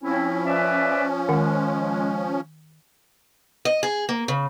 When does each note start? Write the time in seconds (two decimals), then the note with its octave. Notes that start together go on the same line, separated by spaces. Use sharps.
0.03 F3 C4 C#4 E4
0.46 B4 D5 E5
1.29 D#3 G#3 F#5
3.65 D#5
3.83 G#4
4.09 A#3
4.28 C#3